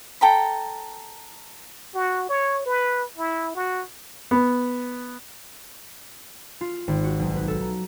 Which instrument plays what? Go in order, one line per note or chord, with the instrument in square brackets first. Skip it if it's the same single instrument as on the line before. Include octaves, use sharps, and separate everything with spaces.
[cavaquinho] A4 G5 A#5 B5
[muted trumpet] F#4
C#5
B4
E4
F#4
[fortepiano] B3
[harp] F4
G#1
F#4
B1
B4
A4
A#5